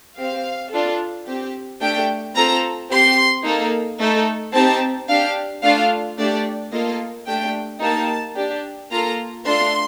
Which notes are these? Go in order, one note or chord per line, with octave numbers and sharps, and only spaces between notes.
C4 G4 F5
D4 F4 A4
C4 G4
A3 D4 G4 G5
C4 F4 A4 A#5
C4 G4 C6
A#3 D#4 A4
A3 D#4 A4
C4 D#4 G4 A5
D4 G4 F5
A3 D4 F4 A4 F5
A3 D4 G4 D5
A#3 F4 A4 D#5
A3 D4 G4 G5
A#3 D#4 G4 A5
D4 G4
A#3 F4 A4 A#5
A3 D4 F4 A4 C6